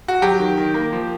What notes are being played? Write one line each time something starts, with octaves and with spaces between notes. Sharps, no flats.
F#4
F#3 G4
D#3
D#3
A#3
F3